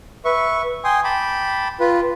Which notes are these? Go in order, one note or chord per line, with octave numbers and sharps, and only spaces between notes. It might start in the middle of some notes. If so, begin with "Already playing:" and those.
B4 E5 C#6
G5 G#5 C6 D#6
G5 A5 B5 D6
F4 B4